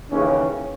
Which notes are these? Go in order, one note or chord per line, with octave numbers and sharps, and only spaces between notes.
D#2 C#3 E3 C#4